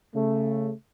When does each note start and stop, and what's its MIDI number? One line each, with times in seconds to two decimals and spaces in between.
0.15 0.72 49
0.15 0.72 57